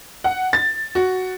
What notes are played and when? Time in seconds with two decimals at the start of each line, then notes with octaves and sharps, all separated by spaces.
0.24 F#5
0.53 A6
0.95 F#4